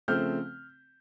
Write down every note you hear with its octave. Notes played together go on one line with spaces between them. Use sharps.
C#3 F3 A3 C4 F6 G6